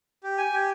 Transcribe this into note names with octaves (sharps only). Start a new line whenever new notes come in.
G4
G#5
G4